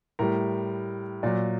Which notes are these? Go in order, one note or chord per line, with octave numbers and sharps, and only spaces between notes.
A2 G3 A#4
A#2 F#3 D5